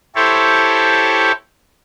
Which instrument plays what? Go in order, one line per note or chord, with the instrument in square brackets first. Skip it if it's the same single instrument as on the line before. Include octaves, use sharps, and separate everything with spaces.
[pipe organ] E4 G4 A4 C5 C#5